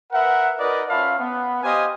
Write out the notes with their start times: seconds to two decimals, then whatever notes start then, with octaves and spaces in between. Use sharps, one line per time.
0.12 A#4 B4 E5 F#5
0.60 D#4 F#4 A#4 B4 D5 D#5
0.89 C#4 F4 E5 F5 A5 B5
1.19 B3
1.63 G4 C5 D#5 F5 G#5 D#6